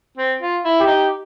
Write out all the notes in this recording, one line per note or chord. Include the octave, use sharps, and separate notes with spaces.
C4
F4
E4
G4
D#4